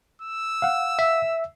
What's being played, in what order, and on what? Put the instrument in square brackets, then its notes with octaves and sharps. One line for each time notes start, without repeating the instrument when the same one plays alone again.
[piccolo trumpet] E6
[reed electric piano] F5 F#5
[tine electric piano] E5